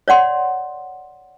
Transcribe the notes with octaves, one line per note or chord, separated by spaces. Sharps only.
C#5 D5 F#5 C6